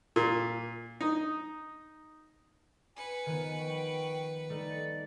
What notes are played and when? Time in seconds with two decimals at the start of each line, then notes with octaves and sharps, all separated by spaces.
0.16 A#2
1.01 D#4
2.96 B4 G#5 C#7
3.26 D#3 F3 B3
3.59 G5 C#6
4.50 G3 A3 D#4 D5